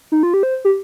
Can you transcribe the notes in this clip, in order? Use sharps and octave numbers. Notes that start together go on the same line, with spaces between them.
D#4
F4
G4
C5
G4